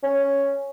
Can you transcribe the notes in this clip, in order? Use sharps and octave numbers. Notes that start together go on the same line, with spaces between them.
C#4